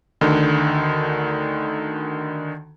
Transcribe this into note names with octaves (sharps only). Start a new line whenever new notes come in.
D2 D3 D#3